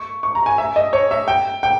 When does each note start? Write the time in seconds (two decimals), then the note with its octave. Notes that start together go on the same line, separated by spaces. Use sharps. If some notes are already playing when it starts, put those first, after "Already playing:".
Already playing: C#6
0.23 C#6
0.35 A#5
0.46 G#5
0.58 E5
0.76 D#5
0.93 C#5
1.11 E5
1.28 G5
1.63 G5